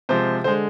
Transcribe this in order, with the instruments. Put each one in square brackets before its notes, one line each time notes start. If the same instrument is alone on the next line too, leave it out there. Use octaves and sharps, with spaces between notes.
[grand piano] C3 F3 G#3 C5
D3 G#3 C5